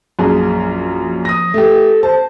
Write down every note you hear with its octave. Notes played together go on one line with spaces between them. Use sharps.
A#1 F#2 G#4
F3
D#6 A#6
A3 G4 A4
C5 A5